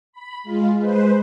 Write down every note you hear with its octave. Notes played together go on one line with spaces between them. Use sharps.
B5
G#3 F4
G#3 B4 C5